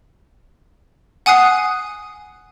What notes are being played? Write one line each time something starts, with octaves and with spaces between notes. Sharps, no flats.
F#5 G#5 D#6 F#6 C7